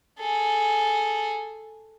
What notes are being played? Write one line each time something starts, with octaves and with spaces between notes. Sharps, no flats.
G#4 A4